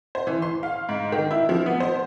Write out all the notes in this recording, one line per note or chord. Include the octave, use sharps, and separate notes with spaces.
C5
E3
C6
F5
G#2
D#3
E4
F3
B3
C5